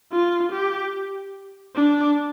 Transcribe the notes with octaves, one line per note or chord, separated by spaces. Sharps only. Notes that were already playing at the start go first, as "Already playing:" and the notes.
F4
G4
D4